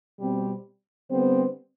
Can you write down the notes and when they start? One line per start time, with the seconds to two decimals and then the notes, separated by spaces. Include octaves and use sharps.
0.19 B2 G3 C4
1.10 D3 G3 B3 C4 C5